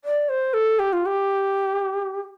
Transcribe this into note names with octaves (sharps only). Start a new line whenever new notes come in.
D5
C5
A4
G4
F4
G4